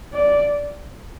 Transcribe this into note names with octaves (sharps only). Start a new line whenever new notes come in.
D5